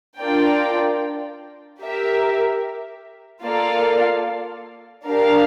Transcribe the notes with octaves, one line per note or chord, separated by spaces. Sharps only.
D4 F4 A#4 D5 G5
G4 A#4 E5
A#3 F4 A4 D5 F5
D4 G4 A#4 F5